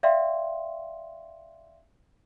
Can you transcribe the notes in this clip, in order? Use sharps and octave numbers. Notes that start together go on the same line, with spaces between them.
D5 E5 F5 G5 C6